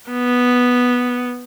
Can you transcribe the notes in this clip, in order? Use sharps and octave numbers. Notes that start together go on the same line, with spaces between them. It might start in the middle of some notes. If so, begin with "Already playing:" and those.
B3